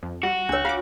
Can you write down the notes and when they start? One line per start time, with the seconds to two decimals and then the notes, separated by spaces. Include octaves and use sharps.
0.03 F2
0.23 G3 F#4
0.49 C#2 D4 C#5 E6
0.65 F4 F5 D6